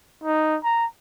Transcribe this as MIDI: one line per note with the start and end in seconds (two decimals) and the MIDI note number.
0.24 0.57 63
0.64 0.86 82